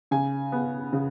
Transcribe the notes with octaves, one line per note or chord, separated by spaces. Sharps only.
C#3 G#5
B3
C#3